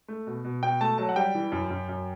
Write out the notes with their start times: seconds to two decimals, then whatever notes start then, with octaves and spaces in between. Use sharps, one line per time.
0.08 A3
0.27 B2
0.44 B2
0.62 B2 G5
0.81 A3 A5
0.98 F#3 A5
1.09 F#5
1.16 G3 G5
1.35 E3
1.52 F#2
1.70 F#2
1.89 F#2